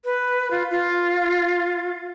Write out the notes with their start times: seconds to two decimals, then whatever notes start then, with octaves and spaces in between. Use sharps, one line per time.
0.05 B4
0.51 F4
0.71 F4